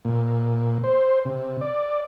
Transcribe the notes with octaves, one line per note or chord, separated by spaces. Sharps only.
A#2
C5
C3
D5